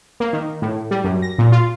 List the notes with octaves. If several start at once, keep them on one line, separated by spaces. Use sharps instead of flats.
A#3
D#3
A2
G3
F#2
A#6
A#2
F4